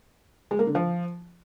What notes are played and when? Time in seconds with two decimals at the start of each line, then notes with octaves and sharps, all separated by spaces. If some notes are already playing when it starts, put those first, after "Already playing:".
0.51 G#3
0.59 A#3
0.67 D3
0.75 F3